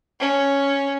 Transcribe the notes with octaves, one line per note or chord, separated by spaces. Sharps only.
C#4